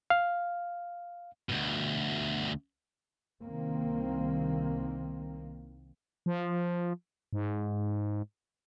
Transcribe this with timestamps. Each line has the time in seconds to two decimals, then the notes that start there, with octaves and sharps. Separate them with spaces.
0.10 F5
1.49 D2 B2
3.44 C2 D#3 A#3 C4
6.26 F3
7.33 G#2